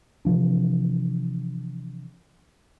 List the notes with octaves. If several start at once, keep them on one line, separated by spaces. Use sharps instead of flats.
C3 E3 F3 D4